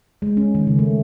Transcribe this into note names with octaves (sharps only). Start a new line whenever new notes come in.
G#3
C#4
D#3
C#3
A3